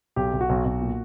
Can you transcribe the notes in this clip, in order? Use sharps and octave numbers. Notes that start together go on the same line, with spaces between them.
B1 G4
B1
F#4
B1
B1
A#2